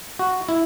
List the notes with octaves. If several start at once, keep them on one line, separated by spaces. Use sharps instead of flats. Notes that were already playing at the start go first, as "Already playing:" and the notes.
F#4
E4